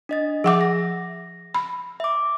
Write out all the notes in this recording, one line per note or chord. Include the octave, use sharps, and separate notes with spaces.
D4 D#5 A6
F3 G#4 E5 F#5 D6
A#6
B5
E5 D6